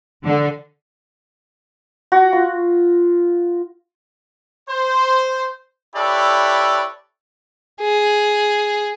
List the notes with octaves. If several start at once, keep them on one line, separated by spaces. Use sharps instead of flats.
D3
F#4
F4
C5
E4 G4 A4 B4 C#5 D5
G#4